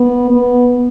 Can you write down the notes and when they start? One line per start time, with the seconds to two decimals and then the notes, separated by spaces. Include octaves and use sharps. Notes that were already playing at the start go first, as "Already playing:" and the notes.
Already playing: B3
0.30 B3